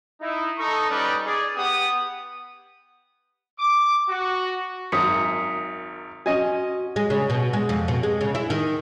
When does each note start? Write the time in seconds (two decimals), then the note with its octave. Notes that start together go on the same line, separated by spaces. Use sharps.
0.22 D#4 E4
0.58 D#4 A4 A#5 C#6 D#6
0.90 G3 C#4 D#4 B4 D5
1.26 G#4 D5
1.56 B3 G4 F#5 D#6
3.59 D6
4.09 F#4
4.92 G#1 F#2 D#6 B6 C#7
6.26 C#4 F#4 D#5 G#5
6.96 G#3
7.10 C#3
7.30 B2
7.53 G#3
7.69 F2
7.88 B2
8.03 G#3
8.21 C#3
8.35 E4
8.50 D#3